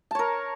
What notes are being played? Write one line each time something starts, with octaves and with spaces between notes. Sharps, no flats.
A#4 C#5 A5